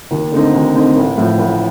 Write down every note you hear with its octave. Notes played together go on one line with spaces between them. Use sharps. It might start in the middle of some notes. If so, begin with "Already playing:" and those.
D#2
D3 A3 C4 D#4
D#2
D3 A3 C4 D#4
A1
A2 F3 A3
A1